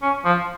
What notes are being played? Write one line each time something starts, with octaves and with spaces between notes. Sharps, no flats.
C#4
F3